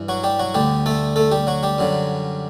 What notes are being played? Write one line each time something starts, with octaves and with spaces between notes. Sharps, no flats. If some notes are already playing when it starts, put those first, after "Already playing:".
Already playing: G2 E3
F#3 F#4
G3 G4
F#3 F#4
D2 D3 G3 G4
A3 A4
A3 A4
G3 G4
F#3 F#4
G3 G4
F#2 D3 F#3